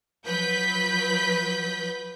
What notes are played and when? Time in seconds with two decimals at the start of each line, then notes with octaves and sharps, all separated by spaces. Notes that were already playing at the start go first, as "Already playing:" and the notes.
0.25 F3 F#3 B4 G6 B6